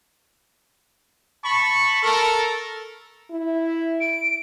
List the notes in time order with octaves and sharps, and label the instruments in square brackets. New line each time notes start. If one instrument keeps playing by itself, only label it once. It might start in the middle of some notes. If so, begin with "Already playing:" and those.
[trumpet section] A5 B5 C#6
A4 A#4
[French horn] E4
[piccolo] D7